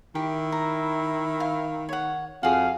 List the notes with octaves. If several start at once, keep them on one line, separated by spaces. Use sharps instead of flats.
D#3 E4 G4
A#5
F5
C#5 F#5
F2 F#4 G#4 F5